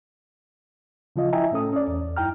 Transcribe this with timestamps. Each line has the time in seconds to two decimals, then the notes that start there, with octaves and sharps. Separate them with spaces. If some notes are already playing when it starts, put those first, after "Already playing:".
1.16 C#3 F3 F4 D#5 F5
1.33 E4 D#5 E5 G5 G#5 A#5
1.52 A2 A3 C#4 A4 D#6
1.73 C#4 D5
1.87 E2
2.17 F#2 D#4 E4 G5 A#5 F6